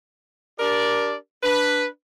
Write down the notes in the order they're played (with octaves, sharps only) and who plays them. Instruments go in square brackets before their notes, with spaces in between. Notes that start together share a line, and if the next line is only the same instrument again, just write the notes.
[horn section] D4 G4 A#4 D5
D4 B4